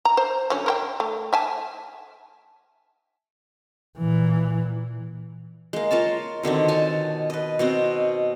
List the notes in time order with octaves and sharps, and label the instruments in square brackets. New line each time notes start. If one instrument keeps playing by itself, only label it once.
[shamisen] A#5
C5
D3 F#3 C#4
A#4 C5 G5
A3
E5 G#5 A5
[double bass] A#2 E3
[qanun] G#3 A#3
F4 A#4 C#5 A5
B2 D3 D#3 C4
C#5 G#5 A5
B4 D#5
B2 C4 F#4